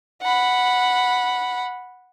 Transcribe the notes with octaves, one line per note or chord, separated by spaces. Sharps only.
F#5 B5